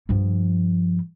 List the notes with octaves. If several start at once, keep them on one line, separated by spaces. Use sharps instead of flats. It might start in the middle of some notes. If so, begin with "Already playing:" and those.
G2 F3